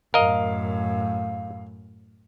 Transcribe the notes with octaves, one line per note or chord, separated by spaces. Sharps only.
F#2 A2 A#4 D#5 F5